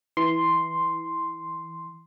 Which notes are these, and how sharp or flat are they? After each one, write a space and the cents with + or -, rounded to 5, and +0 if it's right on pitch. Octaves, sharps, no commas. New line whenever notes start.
E3 -10 C6 +0